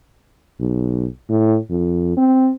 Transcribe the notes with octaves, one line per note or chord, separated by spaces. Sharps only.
B1
A2
F2
C4